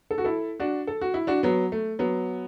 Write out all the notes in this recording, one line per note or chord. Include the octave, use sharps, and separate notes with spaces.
A4
F#4
E4 A4
D4 F#4
A4
F#4
E4
D4 F#4
F#3 B3
A3
F#3 B3